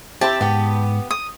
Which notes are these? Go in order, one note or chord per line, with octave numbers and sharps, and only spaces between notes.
C4 E4 G4 A5
G#2 B3 G4
D#6